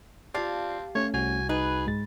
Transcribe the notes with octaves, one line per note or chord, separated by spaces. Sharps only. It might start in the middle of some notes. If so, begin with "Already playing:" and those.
C4 F4 G4 D5 F5 A5
A3 C#4 C#5
C2 F#4 G#5
D#4 G#4 B4
G#2 G#3 A6